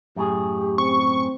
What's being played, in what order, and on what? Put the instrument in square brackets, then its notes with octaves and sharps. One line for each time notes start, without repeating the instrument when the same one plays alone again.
[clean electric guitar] F#2 A2 G#4 [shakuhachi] G4
[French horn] C4 [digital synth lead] C#6